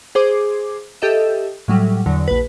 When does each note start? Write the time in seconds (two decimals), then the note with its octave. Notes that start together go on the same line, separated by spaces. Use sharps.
0.15 G#4 C5 D6
1.02 G4 A4 D#5 E5
1.68 A2 F#3 G3
2.06 E2 D3 F#3
2.28 A#1 B4